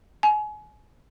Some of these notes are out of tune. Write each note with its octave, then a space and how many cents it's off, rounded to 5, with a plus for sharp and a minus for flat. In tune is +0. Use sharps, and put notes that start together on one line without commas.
G#5 +30